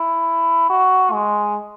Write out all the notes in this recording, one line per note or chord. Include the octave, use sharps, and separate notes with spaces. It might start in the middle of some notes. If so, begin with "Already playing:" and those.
Already playing: E4
F#4
G#3